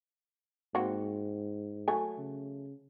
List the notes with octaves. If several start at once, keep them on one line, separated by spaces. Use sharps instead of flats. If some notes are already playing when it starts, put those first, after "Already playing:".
G#2 A#3 C4 F#4
F#3 A3 G#5
C#3